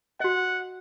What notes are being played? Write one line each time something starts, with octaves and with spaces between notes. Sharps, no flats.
F#4 D#5 F#5